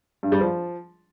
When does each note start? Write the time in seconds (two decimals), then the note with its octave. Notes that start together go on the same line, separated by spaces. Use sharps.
0.23 G2
0.32 G3
0.41 F3